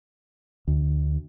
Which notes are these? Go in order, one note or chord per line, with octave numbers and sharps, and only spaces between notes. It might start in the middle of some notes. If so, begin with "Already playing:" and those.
D2